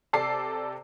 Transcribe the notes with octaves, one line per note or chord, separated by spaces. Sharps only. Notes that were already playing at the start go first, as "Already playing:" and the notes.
C3 A4 D5 C7